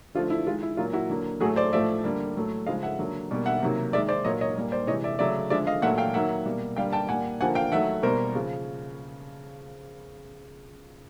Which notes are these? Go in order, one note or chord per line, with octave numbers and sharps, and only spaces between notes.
D3 F3 A3 F4
E4
D#3 G#3 F4
E4
A#2 F#3 A#3 F4
E4 F#4
D3 F#3 A#3
A2 F#3 A3 F#4 G#4
C5 D5
A2 F3 A3 D5 E5
D3 G3 A#3
A2 F#3 A3
C#3 F3 G#3 D#5 F5
E5 F#5
D3 F#3 A#3
B2 G3 A#3
E5 F#5
C3 D#3 F#3 A#3
D#3 G#3 D5 E5
C5 D5
A#2 F#3 A#3 C#5 D#5
C#5 D#5
A#2 G3 A#3
C5 D5
C3 E3 G#3 C#5 D#5
D5 E5
C#3 F#3 A3 D5 E5
D3 F3 G#3 D5 E5
D#5 F5
A#2 F#3 A3 E5 F#5
F5 G5
D#3 F#3 A#3 E5 F#5
B2 G3 A#3
D3 G3 A#3 F5 G5
G5 A5
A#2 G3 A#3 F#5 G#5
D3 F3 A#3 F#5 G#5
F5 G5
D#3 F#3 A3 E5 F#5
B2 G3 A#3 A#4 C5
C#3 F3